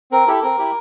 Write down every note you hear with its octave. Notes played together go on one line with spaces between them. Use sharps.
C4 A#4
E4 G4 A4
C4 A#4
E4 G4